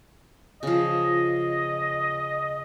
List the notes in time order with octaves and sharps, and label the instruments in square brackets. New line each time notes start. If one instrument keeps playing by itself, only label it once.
[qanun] C#3 F3 [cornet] D#5